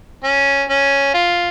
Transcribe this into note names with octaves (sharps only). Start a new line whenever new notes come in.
C#4
C#4
F4